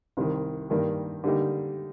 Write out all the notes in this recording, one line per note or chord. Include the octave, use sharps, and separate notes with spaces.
C2 C3 D#3
G2 D#3 A#3 D4
D3 G3 A#3 D#4 G4